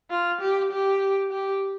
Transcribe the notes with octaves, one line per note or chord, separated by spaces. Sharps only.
F4
G4
G4
G4